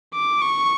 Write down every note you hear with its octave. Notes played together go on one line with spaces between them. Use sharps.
D6
C#6